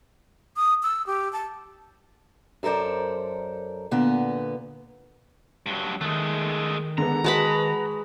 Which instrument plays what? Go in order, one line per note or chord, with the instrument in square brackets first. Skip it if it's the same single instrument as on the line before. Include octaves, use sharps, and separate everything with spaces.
[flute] D#6
E6
G4
A5
[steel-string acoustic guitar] F#2 A4 A#4 C5 D5
A#2 D3 B3
[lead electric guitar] G2 F#3
[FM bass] D#3 [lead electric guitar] G#3 A3 [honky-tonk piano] F#6
[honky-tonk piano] D3 G#3 B3 [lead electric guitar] A#5
[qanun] G#3 A5 B5 [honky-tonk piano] F#4 B4